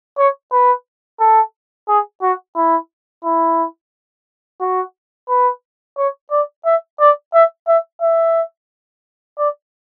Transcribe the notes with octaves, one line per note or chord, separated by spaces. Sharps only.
C#5
B4
A4
G#4
F#4
E4
E4
F#4
B4
C#5
D5
E5
D5
E5
E5
E5
D5